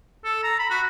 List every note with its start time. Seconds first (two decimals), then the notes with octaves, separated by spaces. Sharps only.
0.24 A4
0.43 A#5
0.59 B5
0.70 F#4